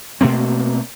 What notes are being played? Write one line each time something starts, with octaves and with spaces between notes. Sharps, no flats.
B2 A3 A#3 C4